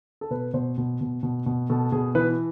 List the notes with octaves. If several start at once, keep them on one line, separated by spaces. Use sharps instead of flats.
A4
B2 B4
B2 C5
B2
B2
B2
B2
B2 A4
B2 G#4
E3 B4